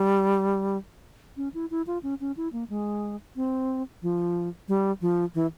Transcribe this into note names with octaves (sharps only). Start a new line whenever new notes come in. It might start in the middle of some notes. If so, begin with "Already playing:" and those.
Already playing: G3
C#4
E4
E4
F4
C#4
C#4
E4
A#3
G#3
C4
F3
G3
F3
E3